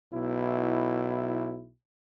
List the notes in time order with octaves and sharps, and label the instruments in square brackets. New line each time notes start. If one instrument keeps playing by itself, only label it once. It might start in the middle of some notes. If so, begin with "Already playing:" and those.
[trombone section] B1 B2 E4